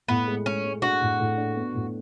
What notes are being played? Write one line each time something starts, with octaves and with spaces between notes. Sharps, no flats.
A2 B3
G#3
G#3 C#4
G#3
D4 F#4
A2
A2
D4
B3
A2